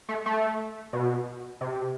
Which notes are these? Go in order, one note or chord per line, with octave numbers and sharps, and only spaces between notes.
A3
A3
B2
C3